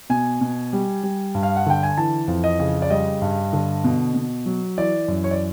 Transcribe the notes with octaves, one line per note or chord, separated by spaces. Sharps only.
B2 G#5
B2
G3
G3
G2
F5
F#5
D3 G5
G#5
E3 A5
F2
D#5
C#3
D5
G3 D#5
G2
D3
B2
B2
F#3
E3 D5
F#2
C#5
D5